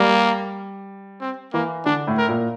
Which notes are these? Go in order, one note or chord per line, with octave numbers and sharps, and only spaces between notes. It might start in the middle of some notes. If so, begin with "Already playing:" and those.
Already playing: G3 A#3
C4
E3 A#3
D3 D4
A2
A#4
A#2